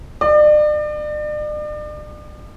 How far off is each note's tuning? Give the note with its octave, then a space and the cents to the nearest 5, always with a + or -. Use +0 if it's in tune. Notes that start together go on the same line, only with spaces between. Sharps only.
D5 +40